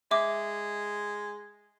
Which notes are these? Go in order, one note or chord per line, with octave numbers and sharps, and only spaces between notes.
G#3 E5 D6